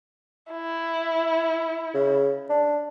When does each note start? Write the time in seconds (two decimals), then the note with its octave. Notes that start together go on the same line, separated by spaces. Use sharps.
0.52 E4
1.94 C#3
2.50 D4